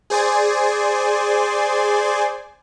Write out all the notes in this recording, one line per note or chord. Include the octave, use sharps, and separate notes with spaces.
G#4 C5 D5 G#5